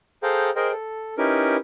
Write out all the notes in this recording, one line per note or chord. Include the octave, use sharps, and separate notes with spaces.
G#4 A4 C5 F5 G5 A#5
G#4 A#4 C5 D#5 G5
A4
C#4 D#4 E4 G4 A#4 B4